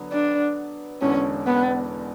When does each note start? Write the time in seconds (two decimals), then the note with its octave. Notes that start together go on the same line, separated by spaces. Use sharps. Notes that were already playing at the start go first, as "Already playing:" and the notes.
Already playing: D3 F#3 B3
0.12 D4
1.01 E1 E2 D3 C#4
1.47 B3